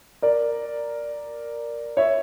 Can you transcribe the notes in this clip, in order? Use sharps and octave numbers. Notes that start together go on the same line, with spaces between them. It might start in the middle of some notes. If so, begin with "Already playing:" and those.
A#4 D5
C#5 E5